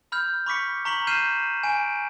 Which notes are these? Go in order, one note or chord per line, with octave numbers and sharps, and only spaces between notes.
B5 F6 G6
B5 C#6 D6 B6 C#7
A#5 C#6 B6 F#7
F6 G6 C7 D#7 E7
G#5 D7